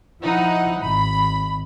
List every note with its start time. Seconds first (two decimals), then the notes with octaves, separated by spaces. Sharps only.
0.22 F3 D#4 E4 F#5
0.81 G#1 B5